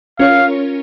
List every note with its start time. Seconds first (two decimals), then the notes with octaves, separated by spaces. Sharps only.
0.19 C#4 F4 A#4 C#5 F5